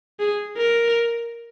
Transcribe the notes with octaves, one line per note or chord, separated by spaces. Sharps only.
G#4
A#4